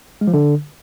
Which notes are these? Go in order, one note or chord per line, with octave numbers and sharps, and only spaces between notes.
G#3
F3
D3